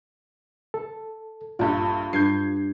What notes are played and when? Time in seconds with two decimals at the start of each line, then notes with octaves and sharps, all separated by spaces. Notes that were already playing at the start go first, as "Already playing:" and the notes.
0.74 A4
1.59 A#1 G2 D4 F4 A4
2.13 G2 G6 G#6 C7